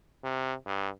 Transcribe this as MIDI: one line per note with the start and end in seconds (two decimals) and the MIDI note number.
0.23 0.53 48
0.66 0.88 43